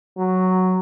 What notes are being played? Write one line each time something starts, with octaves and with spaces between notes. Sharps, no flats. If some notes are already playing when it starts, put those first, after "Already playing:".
F#3